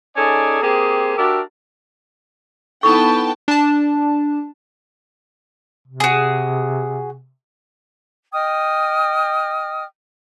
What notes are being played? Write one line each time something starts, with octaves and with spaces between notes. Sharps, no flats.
C#4 D#4 G#4 A4 D5
A#3 C4 G4 G#4
D4 F#4 G4 A#4 E5
B3 D#4 E4 A4 G5 A5 C#6
D4 A5
C3
F#4 G#4
D#5 G5 D#6 F6